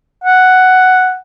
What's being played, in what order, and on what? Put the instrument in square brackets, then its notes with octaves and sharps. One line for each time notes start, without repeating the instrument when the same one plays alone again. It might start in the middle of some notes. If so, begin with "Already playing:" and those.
[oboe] F#5